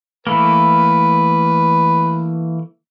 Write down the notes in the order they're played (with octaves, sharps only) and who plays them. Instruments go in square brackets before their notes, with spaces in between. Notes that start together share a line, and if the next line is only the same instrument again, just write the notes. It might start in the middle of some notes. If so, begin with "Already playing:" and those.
[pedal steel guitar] E3 A3 A#3 [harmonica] B4